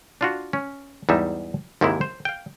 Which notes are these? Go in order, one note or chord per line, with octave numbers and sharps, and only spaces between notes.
D4 F4 F#4
C#4
E2 G#2 G3 D#4 G#4 E5
D#2 G#2 C3 D#3 G#3 E4
C5
F5 G5